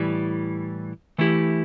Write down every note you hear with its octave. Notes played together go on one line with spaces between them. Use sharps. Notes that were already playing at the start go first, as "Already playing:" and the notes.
Already playing: A2 E3 G3
E3 A3 E4 G4